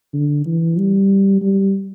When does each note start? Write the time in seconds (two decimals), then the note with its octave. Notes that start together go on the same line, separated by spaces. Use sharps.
0.13 D3
0.46 E3
0.78 G3
1.42 G3